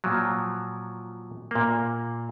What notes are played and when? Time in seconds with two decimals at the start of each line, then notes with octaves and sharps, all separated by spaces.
0.04 A#2 F3 F#3
1.51 A#2 A#3